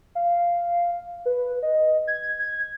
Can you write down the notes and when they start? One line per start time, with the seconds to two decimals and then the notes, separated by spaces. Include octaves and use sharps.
0.15 F5
1.26 B4
1.63 D#5
2.07 G#6
2.39 G#6